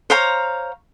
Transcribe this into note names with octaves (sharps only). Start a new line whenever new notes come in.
C5 C#5 F5 A#5